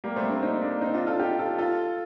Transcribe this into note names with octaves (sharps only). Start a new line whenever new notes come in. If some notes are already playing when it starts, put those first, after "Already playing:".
G3 A#3
A3 C4
A#3 D4
C4 D#4
A#3 D4
C4 D#4
D4 F4
F4 A4
D#4 G4
F4 A4
F4 A4